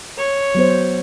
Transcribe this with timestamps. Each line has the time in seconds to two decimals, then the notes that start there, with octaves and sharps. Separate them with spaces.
0.17 C#5
0.55 F#3 B3 C5